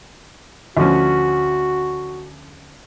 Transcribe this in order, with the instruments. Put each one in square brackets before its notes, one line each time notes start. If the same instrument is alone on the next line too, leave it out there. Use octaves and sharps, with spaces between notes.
[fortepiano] D2 F3 C#4 [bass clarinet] F#4